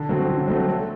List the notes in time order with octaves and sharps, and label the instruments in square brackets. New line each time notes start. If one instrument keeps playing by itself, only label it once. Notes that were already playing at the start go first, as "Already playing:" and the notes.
Already playing: [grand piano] D3
F#3 A3 C4
D3
F#3 A3 C4
A3